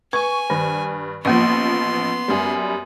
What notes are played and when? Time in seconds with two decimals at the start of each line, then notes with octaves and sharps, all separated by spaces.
0.13 B4 G#5 C#6
0.50 G2 D#3
1.25 A1 F3 A#3 B3 C6 C#6
2.28 F#2 G3